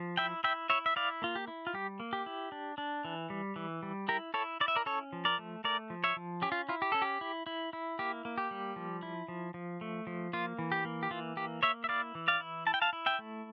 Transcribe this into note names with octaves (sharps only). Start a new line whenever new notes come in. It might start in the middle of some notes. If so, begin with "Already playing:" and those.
Already playing: F3
E4 E5 G5
E4 E5 G5
E4 C#5 E5
E5
E4 D5 F5
A#3 F4
G4
E4
F4
G3 G4
A#3
G4
E4
D4
D4
E3
G3
E3
G3
E4 G4 A#4
E4 A4 C#5
E4 D5
E5
A#4 D5
C#4 A4 C#5
F3
A#4 D5
A3
A3 A#4 D5
F3
C#5 E5
F3
C#4 G4
F4
E4 F4
G4
C#4 A4
G4
E4
E4
E4
A#3 G4
A#3
G4
G3
F3
E4
F3
F3
A3
F3
A#3 F4
E3
G4
A#3
G4
E3 F4
A#3 G4
A#3 C#5 E5
E5
E4 D5 F5
E3
D5 F5
E4
E4 A5
G5
F5 A5
E4
E5 G5
A3